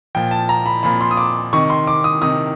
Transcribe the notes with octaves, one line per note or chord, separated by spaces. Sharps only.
A#2 F3 G5
A5
A#5
B5
A#2 F3 B5
C6
D#6
D6
C3 D#3 C#6
C6
D6
D#6
C3 D#3 D#6